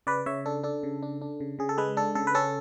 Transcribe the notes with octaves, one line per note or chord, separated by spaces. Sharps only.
C#3 B4 D5
C#3 C#5 E5
D4 A4
D4 A4
C#3
D4
D4
C#3
C#3 G#4
A4
G#3 G#4 B4
D4 A4
C#3 A4
B4
C#4 A4